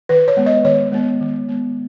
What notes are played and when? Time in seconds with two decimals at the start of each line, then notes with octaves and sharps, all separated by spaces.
0.09 D#3 B4
0.28 C#5
0.37 G#3 B3
0.46 D#5
0.65 D#3 C#5
0.92 G#3 B3
1.21 D#3
1.48 G#3 B3